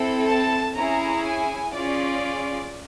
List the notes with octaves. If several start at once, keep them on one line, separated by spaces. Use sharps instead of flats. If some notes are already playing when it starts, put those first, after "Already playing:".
Already playing: C4 E4 A4
A5
C#4 E4 G#4 A#5
G#5
C#4 F4 G#4 D5